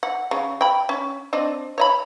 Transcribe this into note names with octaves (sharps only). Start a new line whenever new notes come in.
F#5
C#3
G5 B5
C#4
C4 D4 D#5
C#5 D#5 B5